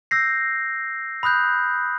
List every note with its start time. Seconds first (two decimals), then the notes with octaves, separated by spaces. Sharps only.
0.11 E6 G6 A#6 C7
1.23 B5 D#6 F#6 G6